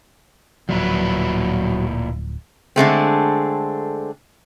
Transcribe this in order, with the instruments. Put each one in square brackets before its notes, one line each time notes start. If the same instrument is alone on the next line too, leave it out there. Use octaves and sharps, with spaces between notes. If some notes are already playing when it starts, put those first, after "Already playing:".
[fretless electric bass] D1 F3 [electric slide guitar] A#2 E4 B4 [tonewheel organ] F#3
[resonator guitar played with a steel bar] D3 G#3 A3 C4